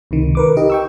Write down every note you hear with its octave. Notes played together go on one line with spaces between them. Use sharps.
C#2 C3 D#3
A#4 B4 D6
D#4 G4 D#5
G5 C#6 E6